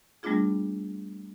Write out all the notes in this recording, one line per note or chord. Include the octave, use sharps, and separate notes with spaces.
G3 A3 B3 D4 F4 G#4